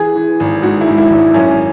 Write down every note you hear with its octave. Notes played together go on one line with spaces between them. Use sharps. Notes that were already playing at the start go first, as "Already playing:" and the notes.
Already playing: E3 G#4
E3
G#1
G#2 F#4
E4
G#2
E4
G#1
F#2 C#4